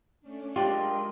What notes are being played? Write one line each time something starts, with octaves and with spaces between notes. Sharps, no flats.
A3 C#4 D4
G#3 D4 F4 G4 A#4 D#5